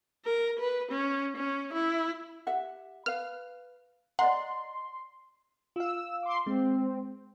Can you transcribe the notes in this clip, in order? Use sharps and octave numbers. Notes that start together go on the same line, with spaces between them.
A#4
B4
C#4
C#4
E4
G4 E5 F#5
B4 F5 F6
D5 D#5 F#5 A#5 C6
F4 F5 E6
C6 D6
G#3 C4